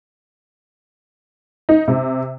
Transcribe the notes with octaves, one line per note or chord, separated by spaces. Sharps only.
D#4
C3